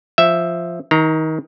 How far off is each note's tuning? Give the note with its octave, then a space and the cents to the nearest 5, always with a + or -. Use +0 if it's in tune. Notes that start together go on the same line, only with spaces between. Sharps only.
F3 +0 E5 +0
D#3 +25 A#5 +0